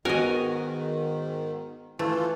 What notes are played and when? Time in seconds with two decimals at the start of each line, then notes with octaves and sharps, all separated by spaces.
0.05 G#2 D#3 B3 F#4 A#4 D#5 G#5
1.99 E3 A3 F4 A4